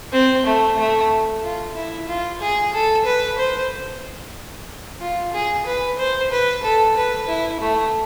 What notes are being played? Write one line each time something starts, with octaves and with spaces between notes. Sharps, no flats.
C4
A3
A3
F4
E4
F4
G#4
A4
B4
C5
F4
G#4
B4
C5
B4
A4
B4
E4
A3